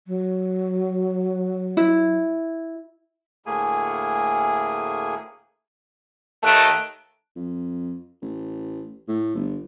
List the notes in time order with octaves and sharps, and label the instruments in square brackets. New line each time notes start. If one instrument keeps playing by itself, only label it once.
[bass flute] F#3
[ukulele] E4
[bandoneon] D2 A2 A3 A#3 G#4 G#5
[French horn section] D#2 D#3 A3 [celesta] A5 F#6 D7
[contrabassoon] F2
A1
A2
G1